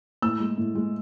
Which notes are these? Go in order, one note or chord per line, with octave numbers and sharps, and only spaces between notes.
A2 E6
G#3
A2
G#3